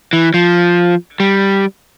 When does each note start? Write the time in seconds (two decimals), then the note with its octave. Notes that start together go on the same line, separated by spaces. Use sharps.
0.13 E3
0.34 F3
1.20 G3